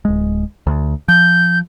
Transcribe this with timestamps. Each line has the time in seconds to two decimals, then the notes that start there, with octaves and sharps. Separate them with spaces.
0.05 D1 G#3
0.67 D2
1.08 F3 G6